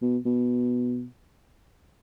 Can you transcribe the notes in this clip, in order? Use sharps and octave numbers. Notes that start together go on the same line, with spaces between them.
B2
B2